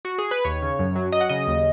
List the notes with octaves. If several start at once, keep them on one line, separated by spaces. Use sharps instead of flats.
F#4
G#4
B4
D#2 C#5
C#3
F#2
F#3
F#3 D#5
F#5
C#3 D#5
D#2